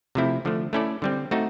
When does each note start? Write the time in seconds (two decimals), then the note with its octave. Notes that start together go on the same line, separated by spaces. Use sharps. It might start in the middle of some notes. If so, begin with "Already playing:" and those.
0.15 C3 F3 A3 C4 E4
0.45 D3 F3 A3
0.73 A3 C#4 E4 A4 D5
1.02 D3 G3 C4
1.31 A3 C4 D#4 F#4